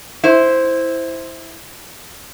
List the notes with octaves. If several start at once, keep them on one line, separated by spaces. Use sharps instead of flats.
E4 C5